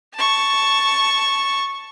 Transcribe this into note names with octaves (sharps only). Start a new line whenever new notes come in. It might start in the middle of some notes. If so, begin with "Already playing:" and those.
A5 C#6